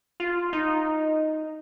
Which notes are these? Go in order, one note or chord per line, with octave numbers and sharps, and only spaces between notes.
F4
D#4